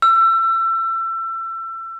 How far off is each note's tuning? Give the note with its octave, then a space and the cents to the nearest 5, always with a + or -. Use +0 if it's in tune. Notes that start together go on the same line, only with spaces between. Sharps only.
E6 +30